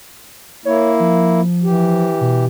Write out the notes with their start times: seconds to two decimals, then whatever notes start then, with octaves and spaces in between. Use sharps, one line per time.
0.65 A#3 E4 C#5
1.00 F3
1.64 E3 G4
2.21 B2